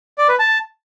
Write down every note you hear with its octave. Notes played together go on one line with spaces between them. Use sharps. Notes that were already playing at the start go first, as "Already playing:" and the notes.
D5
B4
A5